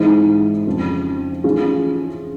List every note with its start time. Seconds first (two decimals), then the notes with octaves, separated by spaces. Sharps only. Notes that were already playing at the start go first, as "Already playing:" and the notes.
Already playing: G#2 E3 G#3 C4 D#4
0.67 F2 C#3 F3
1.44 E3 A3 C#4 F4 G#4